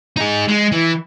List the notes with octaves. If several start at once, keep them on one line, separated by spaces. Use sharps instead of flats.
D#4 G#4
G#3
E3